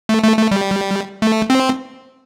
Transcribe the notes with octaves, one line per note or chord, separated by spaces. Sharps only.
A3
A3
A3
G3
A3
C4